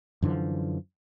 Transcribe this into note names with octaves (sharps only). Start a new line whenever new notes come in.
F#2 D3 E3 F3